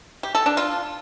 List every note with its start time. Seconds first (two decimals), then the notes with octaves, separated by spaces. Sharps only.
0.23 G4
0.35 A4
0.46 D4
0.57 F4